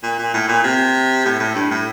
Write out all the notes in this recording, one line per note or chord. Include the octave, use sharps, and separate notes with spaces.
A#2
A#2
A2
A#2
C3
A2
A2
G2
A2